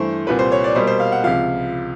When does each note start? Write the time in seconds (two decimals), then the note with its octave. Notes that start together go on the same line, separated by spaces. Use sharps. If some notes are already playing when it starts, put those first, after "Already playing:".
Already playing: G2 E3 A3 C5
0.27 C2 A#2 G3 B4
0.39 C5
0.52 C#5
0.64 D5
0.75 B2 G3 A#3 C5
0.87 C5
1.00 F5
1.12 F#5
1.24 C#2 C3 F3 F5